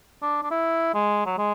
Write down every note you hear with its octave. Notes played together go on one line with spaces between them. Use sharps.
D4
D4
E4
G#3
F#3
G#3